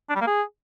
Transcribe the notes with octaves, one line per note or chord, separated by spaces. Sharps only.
D4
G3
A#3
G#4